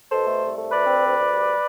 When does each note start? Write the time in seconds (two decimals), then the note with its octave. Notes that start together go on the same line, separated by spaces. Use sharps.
0.10 B2 A4 C5
0.26 A3
0.41 C2
0.56 A3
0.71 D2 B4 D5
0.86 C4
1.02 D2
1.17 D2
1.32 G3